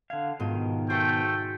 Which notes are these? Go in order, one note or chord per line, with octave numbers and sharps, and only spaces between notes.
D3 F5 G#6
G#2 B2 D#3 F4 D#7
A3 F#4 C5 G5 G#5